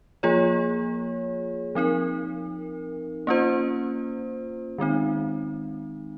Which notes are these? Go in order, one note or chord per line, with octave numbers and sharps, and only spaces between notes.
F3 A#3 F4 G#4 C#5
F3 C4 D#4 A#4
A#3 C#4 F4 C5
D#3 G#3 C4 D#4